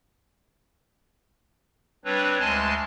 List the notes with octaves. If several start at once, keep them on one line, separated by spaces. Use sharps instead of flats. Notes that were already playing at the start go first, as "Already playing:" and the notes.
G3 C4 D4 B4 C#5
D2 G#3 G#5 A5 C6